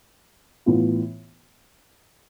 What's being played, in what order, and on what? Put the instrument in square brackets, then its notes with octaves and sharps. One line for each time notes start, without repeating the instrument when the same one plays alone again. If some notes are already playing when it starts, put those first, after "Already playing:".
[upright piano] A2 E3 B3 F4